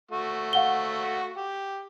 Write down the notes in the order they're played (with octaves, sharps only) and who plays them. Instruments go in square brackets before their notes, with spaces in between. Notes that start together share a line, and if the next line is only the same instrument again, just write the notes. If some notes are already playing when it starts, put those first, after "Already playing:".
[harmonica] A3 F#4
[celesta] F5 F#5 G7
[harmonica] G4